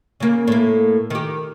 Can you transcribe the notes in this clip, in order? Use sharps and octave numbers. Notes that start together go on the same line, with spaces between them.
C#3 A#3
A2 A#3
D#3 G4